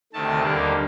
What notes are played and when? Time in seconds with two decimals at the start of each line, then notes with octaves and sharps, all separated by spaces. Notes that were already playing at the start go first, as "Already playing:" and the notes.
0.13 D2 C3 D#3 A3 A5
0.43 D#2 D3 G3 A#3